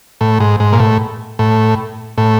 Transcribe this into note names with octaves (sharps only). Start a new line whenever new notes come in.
A2
G#2
G#2
A#2
A2
A2
A2